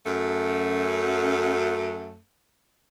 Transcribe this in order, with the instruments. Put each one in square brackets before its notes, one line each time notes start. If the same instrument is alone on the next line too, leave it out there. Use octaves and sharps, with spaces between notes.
[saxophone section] F#2 A3